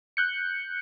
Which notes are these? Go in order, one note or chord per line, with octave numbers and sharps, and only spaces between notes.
F#6 G6 C#7